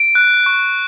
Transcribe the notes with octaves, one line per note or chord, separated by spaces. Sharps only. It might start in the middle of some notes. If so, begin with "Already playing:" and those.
Already playing: D7
F#6
C#6